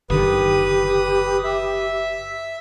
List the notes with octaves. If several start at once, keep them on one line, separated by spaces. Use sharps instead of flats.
F#1 D3 D#3 G4 B4 D#6
E5